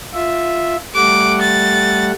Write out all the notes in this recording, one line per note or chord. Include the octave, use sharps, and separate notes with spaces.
F4 E5
G3 A3 F#5 D6
A6